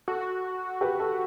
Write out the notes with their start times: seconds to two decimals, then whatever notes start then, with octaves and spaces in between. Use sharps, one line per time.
0.08 F#4 A4
0.81 G4 B4
0.99 A4